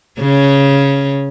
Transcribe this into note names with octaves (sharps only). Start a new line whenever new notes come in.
C#3 C#4